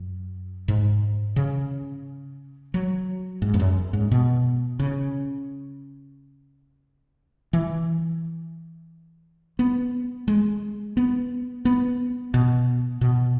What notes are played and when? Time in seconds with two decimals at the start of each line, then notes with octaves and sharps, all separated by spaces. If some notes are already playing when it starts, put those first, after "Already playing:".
Already playing: F#2
0.68 G#2
1.36 C#3
2.74 F#3
3.42 G#2
3.54 E2
3.60 F#2
3.93 G#2
4.12 B2
4.79 C#3
7.53 E3
9.59 B3
10.28 G#3
10.97 B3
11.65 B3
12.34 B2
13.01 B2